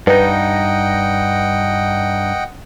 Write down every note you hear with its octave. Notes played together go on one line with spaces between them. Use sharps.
G2 D#4 B4 D#5 F#5 G5